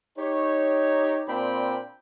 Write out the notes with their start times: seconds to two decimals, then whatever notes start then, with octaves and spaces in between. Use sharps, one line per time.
0.18 D#4 G4 C#5
1.28 A#2 C4 D4 G5 B5